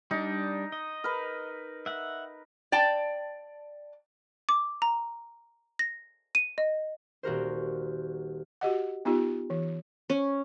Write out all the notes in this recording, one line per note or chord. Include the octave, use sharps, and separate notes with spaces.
G3 D4 D#4
D#5
A#4 B4
E5 F#5
D5 G5 A5
D6
A#5
A#6
D#7
D#5
D#1 F#4 A#4 C5
F#4 G4 D#5 F#5
B3 D#4 F4 G4
E3
C#4